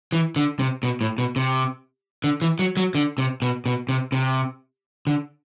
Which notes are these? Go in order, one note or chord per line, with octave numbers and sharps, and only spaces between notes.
E3
D3
C3
B2
A2
B2
C3
D3
E3
F#3
F#3
D3
C3
B2
B2
C3
C3
D3